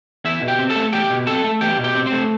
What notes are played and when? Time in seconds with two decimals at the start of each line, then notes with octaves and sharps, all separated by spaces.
0.25 E2 E4 E5
0.42 B2
0.48 G4 G5
0.59 C4
0.70 A4 A5
0.76 A3
0.93 E2 G4 G5
1.10 B2
1.27 C4 A4 A5
1.44 A3
1.61 E2 G4 G5
1.79 B2
1.84 G4 G5
1.95 C4
2.06 C4 C5
2.12 A3